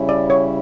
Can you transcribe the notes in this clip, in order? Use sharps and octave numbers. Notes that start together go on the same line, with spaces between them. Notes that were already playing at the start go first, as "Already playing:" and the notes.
Already playing: C#3 G3 C#4 E4
D5
C#5